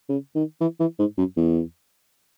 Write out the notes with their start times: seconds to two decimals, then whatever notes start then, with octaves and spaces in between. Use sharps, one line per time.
0.09 C#3
0.35 D#3
0.61 E3
0.80 E3
0.99 G#2
1.18 F#2
1.37 E2